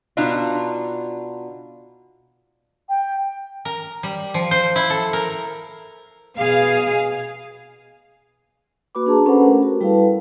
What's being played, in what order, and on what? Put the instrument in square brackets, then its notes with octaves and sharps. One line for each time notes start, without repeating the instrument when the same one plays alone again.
[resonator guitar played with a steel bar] B2 D4 D#4 F4
[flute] G5
[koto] A#4
G3
F3
C5
E4
A4
A#4
[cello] B2 G#4 [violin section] F5
[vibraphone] A#3 F#4 B4 B5 D6
D4 G#4 A5 A#5
C#4 A4 B4 C5 F#5 B5
A3 G4 A#4
F#4
G3 E4 A4 B4 F5 A5